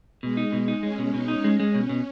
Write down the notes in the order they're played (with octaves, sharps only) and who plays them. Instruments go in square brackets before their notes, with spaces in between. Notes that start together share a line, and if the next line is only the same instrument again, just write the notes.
[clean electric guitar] B2 [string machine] G#3
[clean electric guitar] D#4
B2
D#4
[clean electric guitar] G#3 [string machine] C#4
[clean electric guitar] B2
[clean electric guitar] B2 [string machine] D#4
[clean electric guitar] D#4
[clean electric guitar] G#3 [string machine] C#4
[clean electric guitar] G#3
B2
B2